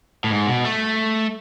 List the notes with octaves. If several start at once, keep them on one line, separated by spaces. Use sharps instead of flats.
A2
G#2
B2
A3